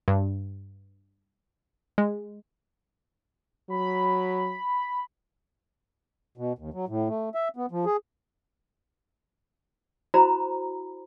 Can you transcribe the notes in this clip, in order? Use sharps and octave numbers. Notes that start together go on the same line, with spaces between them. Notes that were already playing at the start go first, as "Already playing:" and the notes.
G2
G#3
F#3 B5
B2
D#2
F#3
A2
A3
E5
B3
F3
G#4
E4 F#4 C5 A#5 B5